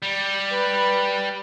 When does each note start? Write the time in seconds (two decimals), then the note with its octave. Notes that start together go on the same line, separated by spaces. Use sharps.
0.02 G3
0.50 B4